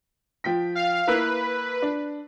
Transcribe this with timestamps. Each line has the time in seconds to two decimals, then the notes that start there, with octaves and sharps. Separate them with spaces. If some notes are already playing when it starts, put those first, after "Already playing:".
0.44 F3 G5 B6
0.75 F5
1.07 A#3 E4 B4 F#6
1.82 D4